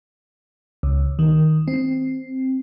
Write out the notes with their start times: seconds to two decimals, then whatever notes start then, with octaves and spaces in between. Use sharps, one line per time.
0.83 C#2
1.19 D#3
1.68 C4